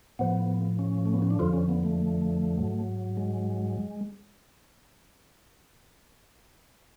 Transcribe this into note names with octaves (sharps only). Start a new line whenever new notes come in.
A2 F3 B3
C#4
A3
B3
C#4
D4
F2 D3 F3 F4
C#4
B3
A3
A3
G#2 F#3
G#3